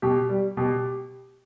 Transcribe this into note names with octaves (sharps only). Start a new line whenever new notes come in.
B2 G4
G3
B2 G4